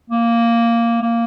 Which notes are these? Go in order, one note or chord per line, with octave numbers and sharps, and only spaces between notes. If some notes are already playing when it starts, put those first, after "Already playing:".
A#3
A#3